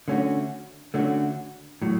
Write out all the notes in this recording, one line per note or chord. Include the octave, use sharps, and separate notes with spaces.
D3 A3 C#4 F#4
D3 A3 C#4 F#4
A2 F#3